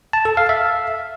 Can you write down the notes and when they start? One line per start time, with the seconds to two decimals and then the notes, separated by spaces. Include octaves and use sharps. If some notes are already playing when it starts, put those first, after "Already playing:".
0.13 A5
0.25 A4
0.37 F5
0.49 E5